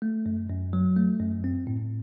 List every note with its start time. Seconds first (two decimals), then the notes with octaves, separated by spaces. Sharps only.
0.02 A3
0.26 F#2
0.50 F#2
0.73 F#3
0.96 A3
1.20 F#2
1.44 C4
1.67 A2